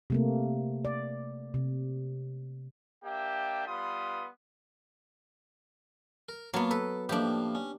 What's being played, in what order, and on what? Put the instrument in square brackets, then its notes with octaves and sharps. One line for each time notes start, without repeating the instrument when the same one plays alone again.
[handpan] C3 A3 A#3
D5
C3
[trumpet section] A#3 D4 G4 E5 G5
G3 B3 F4 B4 C6 D#6
[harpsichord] A#4
[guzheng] F#3 B3 [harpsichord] A#3 F4 A5
[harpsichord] A4 [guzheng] B4
[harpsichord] A2 F3 A#3 [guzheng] D4 G4
[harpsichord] C#4